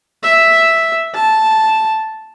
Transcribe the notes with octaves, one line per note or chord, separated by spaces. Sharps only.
E5
A5